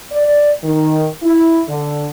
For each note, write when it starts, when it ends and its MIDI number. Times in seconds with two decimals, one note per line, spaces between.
0.11 0.50 74
0.64 1.07 51
1.23 1.60 64
1.68 2.08 50